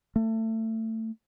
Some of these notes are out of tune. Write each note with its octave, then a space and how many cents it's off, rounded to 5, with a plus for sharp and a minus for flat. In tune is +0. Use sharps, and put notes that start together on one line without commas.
A3 +25